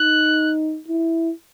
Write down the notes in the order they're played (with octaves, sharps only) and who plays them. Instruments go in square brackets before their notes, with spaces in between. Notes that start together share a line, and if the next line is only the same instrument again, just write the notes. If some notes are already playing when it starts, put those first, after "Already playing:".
Already playing: [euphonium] D#4 [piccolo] F#6
[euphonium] E4